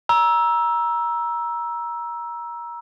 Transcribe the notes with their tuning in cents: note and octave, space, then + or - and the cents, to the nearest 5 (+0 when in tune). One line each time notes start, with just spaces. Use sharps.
A#5 +25 E6 +0